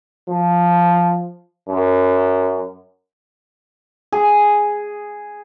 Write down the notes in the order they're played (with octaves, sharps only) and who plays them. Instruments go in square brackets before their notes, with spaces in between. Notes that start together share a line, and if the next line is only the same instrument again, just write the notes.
[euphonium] F3
F#2
[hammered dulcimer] G#4